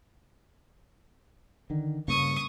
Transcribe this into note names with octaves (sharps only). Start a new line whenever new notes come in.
D3 D#3
G2 C#3 A#3 C#6 D#6